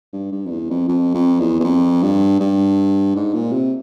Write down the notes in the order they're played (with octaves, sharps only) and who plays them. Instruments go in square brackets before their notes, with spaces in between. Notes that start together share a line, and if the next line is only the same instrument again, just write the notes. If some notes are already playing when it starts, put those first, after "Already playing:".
[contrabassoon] G2
G2
F2
E2
F2
F2
F2
E2
E2
F2
G2
G2
G#2
A#2
C3